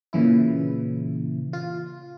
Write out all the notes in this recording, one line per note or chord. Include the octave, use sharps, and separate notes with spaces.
A#2 C#3 E3 E4
F4